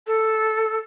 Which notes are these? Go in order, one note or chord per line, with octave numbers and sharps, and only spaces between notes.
A4